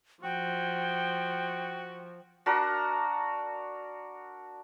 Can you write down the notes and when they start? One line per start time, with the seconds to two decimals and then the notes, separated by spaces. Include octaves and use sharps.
0.23 F3 F#4 G5
2.46 D4 F#4 A#4